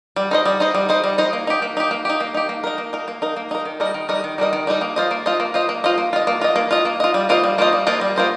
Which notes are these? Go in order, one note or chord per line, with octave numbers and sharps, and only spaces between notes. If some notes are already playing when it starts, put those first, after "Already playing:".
G3
D#4 C5 D#5
G3
D#4 C5 D#5
G3
D#4 C5 D#5
G3
D#4 C5 D#5
A#3
D#4 G4
A#3
D#4 G4
A#3
D#4 G4
A#3
D#4 G4
A#3
D#4 A#4
A#3
D#4 A#4
A#3
D#4 A#4
A#3
D#4 A#4
D#3
G3 D#4 A#4 D#5
D#3
G3 D#4 A#4 D#5
D#3
G3 D#4 A#4 D#5
D#3
G3 D#4 A#4 D#5
A#3
F4 C5 D#5
A#3
F4 C5 D#5
A#3
F4 C5 D#5
A#3
F4 C5 D#5
A#3
F4 D#5
A#3
F4 D#5
A#3
F4 D#5
A#3
F4 D#5
G3
A#3 F4 C5 D#5
G3
A#3 F4 C5 D#5
G3
A#3 F4 C5 D#5
G3
A#3 F4 C5 D#5